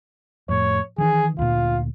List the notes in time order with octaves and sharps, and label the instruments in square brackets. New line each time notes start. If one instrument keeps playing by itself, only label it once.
[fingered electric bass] F2 A2 [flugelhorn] C#5
[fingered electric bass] D#3 E3 [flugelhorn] G#4
[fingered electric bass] D2 A#2 [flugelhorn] F4